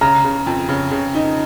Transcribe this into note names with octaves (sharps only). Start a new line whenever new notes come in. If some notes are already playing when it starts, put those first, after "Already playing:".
C#3 A#5
C#3
F2
C#3
C#3
D#4